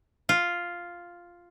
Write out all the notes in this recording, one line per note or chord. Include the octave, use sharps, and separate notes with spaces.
F4